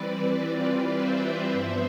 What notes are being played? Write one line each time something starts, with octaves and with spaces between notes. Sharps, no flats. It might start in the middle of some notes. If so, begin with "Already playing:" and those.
Already playing: E3 G3 C4 E4 B4 D5
E3 G3 C4 F4
C5 E5
G2 F3 B3